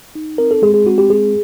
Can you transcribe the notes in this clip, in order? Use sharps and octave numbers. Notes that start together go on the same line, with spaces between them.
D#4
C4 A#4
A4
G#3 G#4
G#4
C4 F#4
G4
G#3 G#4